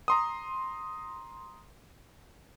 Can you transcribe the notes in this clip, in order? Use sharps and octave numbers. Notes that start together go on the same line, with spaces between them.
A#5 C6 D#6